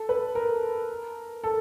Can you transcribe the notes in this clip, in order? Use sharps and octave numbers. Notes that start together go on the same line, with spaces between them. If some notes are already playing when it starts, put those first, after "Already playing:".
Already playing: A4
B4
A#4
A4